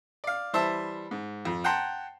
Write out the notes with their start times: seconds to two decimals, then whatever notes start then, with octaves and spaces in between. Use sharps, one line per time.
0.24 D5 F5
0.53 E3 G3 C5 E5 A5
1.11 G#2
1.45 F2
1.64 F#5 G5 A5 A#5 C6